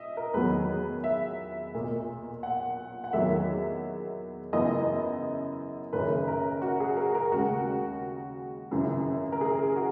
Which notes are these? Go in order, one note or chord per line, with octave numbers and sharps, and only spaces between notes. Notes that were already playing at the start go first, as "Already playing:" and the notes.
Already playing: D#5 E5
A#4
E2 D#3 F#3 B3 B4
E5
B1 A#2 A#3
F#5
F#5
E2 D#3 F#3 A#3 E5
F#2 C#3 E3 B3 D#5
F#1 F#2 D#3 A#3 C#4 B4
A#4
F#4
G#4
A#4
A#4
D#2 C#3 G#3 F#4
G#1 F#2 C#3 E3
A#4
G#4
F#4